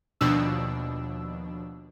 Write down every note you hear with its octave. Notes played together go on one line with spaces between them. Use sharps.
D#2 B2 F3 D4 E6